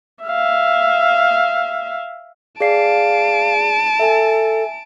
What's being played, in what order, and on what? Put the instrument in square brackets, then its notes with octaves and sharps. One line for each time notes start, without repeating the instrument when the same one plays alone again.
[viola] E5 F5
[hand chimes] G#4 D5 C7 [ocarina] F5 [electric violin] A5 D7
[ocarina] A4 [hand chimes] E5 G#5